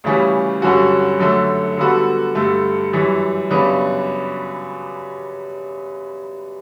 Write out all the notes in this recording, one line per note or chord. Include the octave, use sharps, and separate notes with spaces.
D2 C#3 E3 G3 C#4
G2 D3 F#3 C#4 F#4
F#2 D3 F#3 A3
D3 G3 B3 F#4 A4
G2 D3 A3
F#2 E3 G3
F#2 C#3 G3 B3 D4